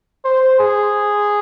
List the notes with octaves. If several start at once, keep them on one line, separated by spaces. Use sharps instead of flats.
C5
G#4